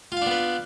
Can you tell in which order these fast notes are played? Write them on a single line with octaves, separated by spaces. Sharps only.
F4 F5 D4 B3 B4